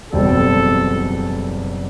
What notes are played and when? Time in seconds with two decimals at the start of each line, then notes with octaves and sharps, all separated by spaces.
0.12 F#1 E2 B2 G3 C4 A4